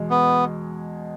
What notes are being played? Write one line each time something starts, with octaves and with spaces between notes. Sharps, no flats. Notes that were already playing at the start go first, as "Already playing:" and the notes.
Already playing: E2 B2 G#3
B3